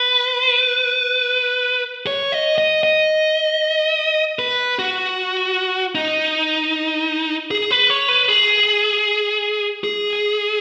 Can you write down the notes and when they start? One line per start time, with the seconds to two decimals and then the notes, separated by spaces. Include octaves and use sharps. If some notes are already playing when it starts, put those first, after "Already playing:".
Already playing: B4
2.07 C#5
2.32 D#5
2.58 D#5
2.83 D#5
4.39 B4
4.79 F#4
5.95 D#4
7.51 G#4
7.71 B4
7.90 C#5
8.08 B4
8.28 G#4
9.84 G#4